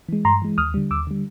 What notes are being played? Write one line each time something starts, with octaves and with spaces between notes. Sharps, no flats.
E3 G#3
G2 A#5 C6
E3 G#3
D#2 D#6 F6
D3 G3
D#2 D6 E6
D3 G3